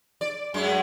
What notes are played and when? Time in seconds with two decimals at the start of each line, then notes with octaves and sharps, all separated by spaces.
0.21 D5
0.54 F#2 G#3